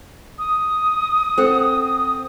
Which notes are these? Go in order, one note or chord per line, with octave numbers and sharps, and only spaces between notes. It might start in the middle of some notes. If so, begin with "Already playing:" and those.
D#6
C4 A4 F#5